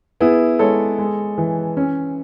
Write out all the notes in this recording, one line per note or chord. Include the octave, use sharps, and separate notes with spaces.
B3 E4 G#4
G#3 A4 C#5
G#3
E3
C#4